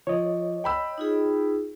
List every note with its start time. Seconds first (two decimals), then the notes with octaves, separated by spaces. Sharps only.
0.07 F3 C#5 D#5
0.64 G5 B5 E6
0.98 D#4 F4 G#4